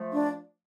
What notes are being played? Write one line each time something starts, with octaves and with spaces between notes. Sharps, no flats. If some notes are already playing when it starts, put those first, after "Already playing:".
Already playing: F3 A3
D4